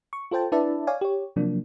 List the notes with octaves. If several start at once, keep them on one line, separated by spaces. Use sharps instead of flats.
C#6
F4 A4 C5 G5 A5
D4 E4 B4 D5 E5 A5
C#5 D5 F5 G#5
G4 C#5
C3 F3 F#3 A#3 D4